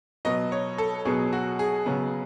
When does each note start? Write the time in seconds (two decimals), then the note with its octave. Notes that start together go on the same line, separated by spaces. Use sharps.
0.25 B2 F#3 B3 D#5
0.52 C#5
0.78 A4
1.05 B2 F#3 B3 G#4
1.33 F#4
1.59 G#4
1.86 C#3 F#3 B3